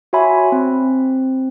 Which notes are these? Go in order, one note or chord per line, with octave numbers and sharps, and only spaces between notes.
F#4 C#5 E5 G#5 B5 C6
C4